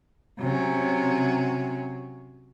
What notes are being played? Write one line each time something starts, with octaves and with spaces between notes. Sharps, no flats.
C3 F#3 C#4